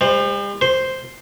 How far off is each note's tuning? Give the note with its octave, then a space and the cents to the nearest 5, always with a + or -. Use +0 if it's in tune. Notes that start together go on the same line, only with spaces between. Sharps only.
G3 +45 C5 +0
C5 +0 C6 +0